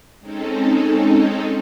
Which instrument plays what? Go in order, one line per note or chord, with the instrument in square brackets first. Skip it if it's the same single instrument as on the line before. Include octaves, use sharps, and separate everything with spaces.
[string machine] G#3 C4 C#4 D#4 A4